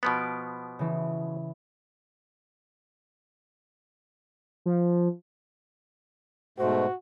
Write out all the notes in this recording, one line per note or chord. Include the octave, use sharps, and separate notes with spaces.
B2 F3 B3 A6 D7
C#3 E3
F3
G#2 B2 A3 F#4 C5